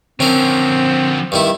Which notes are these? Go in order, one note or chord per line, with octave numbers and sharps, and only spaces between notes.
D3 F3 C4 C#4 A#4
G2 D#3 E4